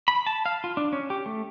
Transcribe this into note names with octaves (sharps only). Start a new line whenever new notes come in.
B5
A5
F5
F4
D4
C#4
G4
A3